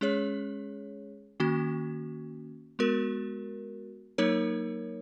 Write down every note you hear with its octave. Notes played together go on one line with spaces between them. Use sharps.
G#3 C#4 G#4 C#5
D#3 A#3 C#4 F#4
G#3 B3 F#4 A#4
F#3 A#3 D#4 A#4 C#5